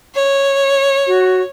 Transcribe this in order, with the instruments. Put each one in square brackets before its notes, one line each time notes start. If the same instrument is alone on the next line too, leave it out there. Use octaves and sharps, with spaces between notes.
[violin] C#5
[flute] F#4